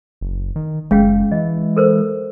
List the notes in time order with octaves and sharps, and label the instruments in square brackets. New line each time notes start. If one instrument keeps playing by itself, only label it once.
[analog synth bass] F#1
D#3
[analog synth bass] F#1 [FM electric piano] G#3 [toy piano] C#4 F5 G5
[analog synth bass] E3 [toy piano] D#5
[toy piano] A4 A#4 C5